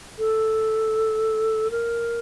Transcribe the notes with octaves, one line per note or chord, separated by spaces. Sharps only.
A4
A#4